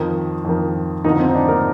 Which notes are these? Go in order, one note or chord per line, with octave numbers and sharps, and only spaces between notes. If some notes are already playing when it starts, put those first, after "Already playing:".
Already playing: F2 D#3
F2 D#3
F2 D3 D#3 D#4
C4
D#4
D4
A#3 A#4